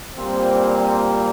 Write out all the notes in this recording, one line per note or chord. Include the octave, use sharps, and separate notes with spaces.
A#2 G3 A#3 C4